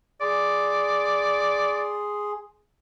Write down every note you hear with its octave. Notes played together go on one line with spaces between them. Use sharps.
G#4 D5 C6